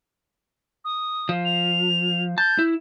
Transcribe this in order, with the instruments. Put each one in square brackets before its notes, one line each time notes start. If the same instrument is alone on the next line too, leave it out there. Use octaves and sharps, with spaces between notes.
[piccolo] D#6
[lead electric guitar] F3
[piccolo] F7
[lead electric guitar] A5 [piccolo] G6
[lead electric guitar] E4